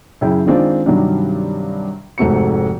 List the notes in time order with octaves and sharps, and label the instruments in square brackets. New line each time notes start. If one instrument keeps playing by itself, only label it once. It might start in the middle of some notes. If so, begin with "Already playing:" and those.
[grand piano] F#2 C#3 E4 G5
D#3 G#3 C4 D4 F4
G2 C3 D#3 F#3 G3 D4
F1 G#2 A3 C4 F#4 C#7